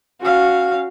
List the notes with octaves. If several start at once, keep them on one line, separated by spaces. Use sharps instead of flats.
C#4 F#4 F5